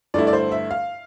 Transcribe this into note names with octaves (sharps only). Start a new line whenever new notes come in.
G2 D3 A3 E4 D5
D5
C5
E5
F5